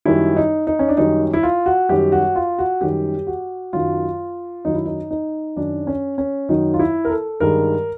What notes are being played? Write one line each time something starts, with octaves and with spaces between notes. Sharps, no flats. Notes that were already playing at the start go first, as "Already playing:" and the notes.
F#2 D#3 G3 E4
D#4
D#4
C#4
D4
F#2 D#3 G3 D#4
E4
F4
F#4
F#2 D#3 G3 G4
F#4
F4
F#4
F#2 D#3 G3 G4
F#4
F#2 D#3 F#3 F4
F#2 D#3 F#3 D#4
E4
D#4
D#4
F#2 D#3 F#3 D4
C#4
C#4
F#2 D#3 F#3 D#4
F4
E4
A#4
A4
G2 D#3 G#3 A#4